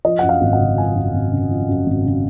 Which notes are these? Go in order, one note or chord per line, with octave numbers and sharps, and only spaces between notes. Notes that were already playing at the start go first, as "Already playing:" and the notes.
F3 D#5
F#2 F#5
F5
G#1
F#5
C#3
F3 G#5
F#2
G#1
C#3
F3
F#2
G#1
C#3